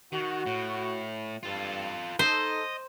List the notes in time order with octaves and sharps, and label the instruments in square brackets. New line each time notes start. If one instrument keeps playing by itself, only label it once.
[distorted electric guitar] D#3 [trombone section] F#4
[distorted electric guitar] A2
[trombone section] G2 [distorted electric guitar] F4 A4
[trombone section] D#4 A4 [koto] C5 [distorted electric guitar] D#5